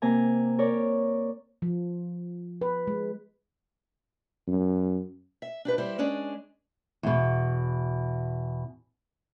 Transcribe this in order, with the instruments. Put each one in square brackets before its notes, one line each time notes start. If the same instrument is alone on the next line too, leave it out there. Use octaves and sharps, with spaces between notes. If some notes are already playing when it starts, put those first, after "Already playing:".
[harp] C3 A#3 G#5 A#5
A#4 C#5 D5
[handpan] F3
B4
G#3
[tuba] F#2
[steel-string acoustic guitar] E5
D4 G4 B4
G3 E4 C5
G#3 C#4 D4 G#4
[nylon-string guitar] E2 B2